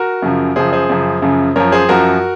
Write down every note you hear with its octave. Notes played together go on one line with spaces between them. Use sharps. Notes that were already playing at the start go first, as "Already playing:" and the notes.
Already playing: F#4 A#4
F#2 C#3 F3
F#2 C#3 F3 G#4 C5
G#4 C5
F#2 C#3 F3
F#2 C#3 F3
F#2 F3 A#4 C#5
G#4 C5
F#2 F3 F#4 A#4